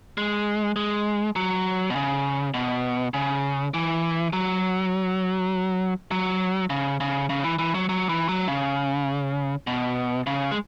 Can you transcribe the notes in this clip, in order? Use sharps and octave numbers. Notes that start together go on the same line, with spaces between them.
G#3
G#3
F#3
B2
C#3
B2
C#3
E3
F#3
F#3
C#3
C#3
C#3
E3
E3
F#3
F#3
E3
F#3
C#3
B2
C#3
G#3